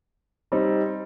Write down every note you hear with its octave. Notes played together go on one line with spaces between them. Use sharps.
G3 C4 D#4